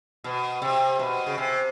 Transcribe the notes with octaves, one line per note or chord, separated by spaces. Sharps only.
B2
C3
B2
C#3
C3